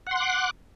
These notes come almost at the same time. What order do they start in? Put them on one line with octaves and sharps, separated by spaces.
F#5 C6 F#6 D6